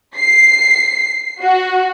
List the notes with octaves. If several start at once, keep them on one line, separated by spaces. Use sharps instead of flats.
C7
F#4